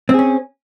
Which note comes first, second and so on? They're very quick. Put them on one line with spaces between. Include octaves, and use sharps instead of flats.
C4 G#4 C#4